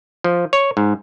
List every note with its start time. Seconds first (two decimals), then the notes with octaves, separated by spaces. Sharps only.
0.24 F3
0.53 C#5
0.77 G#2